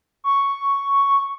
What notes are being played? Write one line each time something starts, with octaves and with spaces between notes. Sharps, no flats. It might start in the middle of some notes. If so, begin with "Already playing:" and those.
C#6